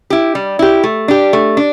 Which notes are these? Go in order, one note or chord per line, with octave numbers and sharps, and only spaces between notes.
E4 G4
G3
E4 G4
A3
D4 G4
A3
D4